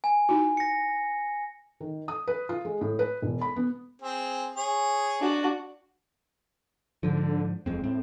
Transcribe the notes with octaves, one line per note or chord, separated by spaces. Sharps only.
G#5
D#4 E4 F#4
A#6 C#7
D#3
D#6
B4
F4
G#3
A2
B4
E1
B5
B3
C4 G#4
G#4 C#5
D4 F#4
G#2 D3 F3
D#1 F2 G#3 C4
A2 C4